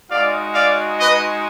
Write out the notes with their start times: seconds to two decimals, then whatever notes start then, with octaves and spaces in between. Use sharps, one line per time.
0.10 G#3 D#4 F#4 D5 F5
0.55 D5 F5
1.00 B4 D#5